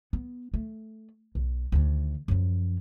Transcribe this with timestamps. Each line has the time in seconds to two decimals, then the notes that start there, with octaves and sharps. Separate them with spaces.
0.13 B3
0.54 A3
1.35 B1
1.72 D2 D#3
2.28 F#2 F3